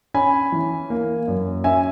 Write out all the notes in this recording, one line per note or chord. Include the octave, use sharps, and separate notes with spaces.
C#4 G#5 B5
E3
A#3
F#2
C#4 E5 G#5